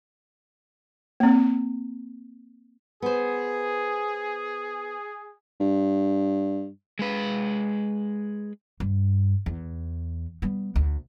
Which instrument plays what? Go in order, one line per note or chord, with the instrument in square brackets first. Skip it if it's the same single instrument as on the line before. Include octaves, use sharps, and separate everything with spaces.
[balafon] A#3 C4
[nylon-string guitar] B3 C5 [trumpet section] G#4
[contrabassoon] G2
[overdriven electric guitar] G#3 B4
[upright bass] G2
E2
G3 B3
D2